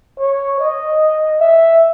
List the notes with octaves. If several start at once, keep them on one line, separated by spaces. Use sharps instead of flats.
C#5
D#5
E5